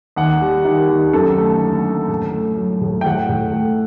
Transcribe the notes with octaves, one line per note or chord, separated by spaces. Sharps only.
D#2 F#5
G3
D#3
D#2
F#2 A4
A3
D3
F#2
A2
A3
F#3
A2
G5
A2 F#5
A2
A3